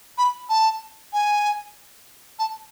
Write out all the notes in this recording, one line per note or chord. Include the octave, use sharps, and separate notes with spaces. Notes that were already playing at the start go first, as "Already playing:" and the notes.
B5
A5
G#5
A5